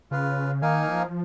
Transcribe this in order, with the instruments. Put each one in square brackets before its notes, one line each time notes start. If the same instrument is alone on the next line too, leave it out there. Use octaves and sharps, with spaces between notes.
[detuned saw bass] C#3 [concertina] F4 B4 F5
[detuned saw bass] D#3 [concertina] A#3 D#4 A#4 F5 G#5
[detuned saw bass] F3